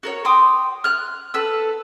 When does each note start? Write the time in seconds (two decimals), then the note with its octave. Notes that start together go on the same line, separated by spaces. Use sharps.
0.03 F#4 A#4 C#5
0.25 G5 C6 D6 D#6
0.84 F6 F#6
1.34 A4 B4 E6